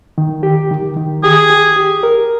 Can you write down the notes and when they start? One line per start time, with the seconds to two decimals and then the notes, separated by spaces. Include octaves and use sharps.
0.18 D#3
0.43 G4
0.71 D#3
0.97 D#3
1.23 G4 G#4
1.50 G4
1.76 G4
2.03 A#4